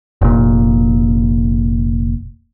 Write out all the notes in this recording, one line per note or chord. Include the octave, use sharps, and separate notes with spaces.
F1 A#2